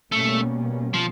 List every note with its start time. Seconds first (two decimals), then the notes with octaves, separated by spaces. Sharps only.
0.12 B2 G3 A3 A#3 C#4
0.94 F3